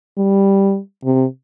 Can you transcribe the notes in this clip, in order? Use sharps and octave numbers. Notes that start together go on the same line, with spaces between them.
G3
C3